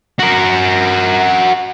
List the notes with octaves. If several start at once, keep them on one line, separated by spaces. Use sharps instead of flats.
F#4 A#4